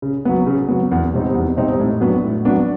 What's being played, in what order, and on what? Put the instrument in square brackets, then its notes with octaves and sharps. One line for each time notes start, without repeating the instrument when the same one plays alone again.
[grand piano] C#3
F#3 B3
C#3
F#3 B3
E2
B2 G3 C4 D#4
E2
B2 G3 C4 D#4
A2
F#3 B3 D4
A2
F#3 B3 D4